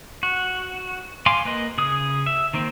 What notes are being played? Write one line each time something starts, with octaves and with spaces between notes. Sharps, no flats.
F#4
F5 G#5 C6 D6
A#3 B4 D#5
C#3 G#4 D#6
E5
D#3 A#3 C4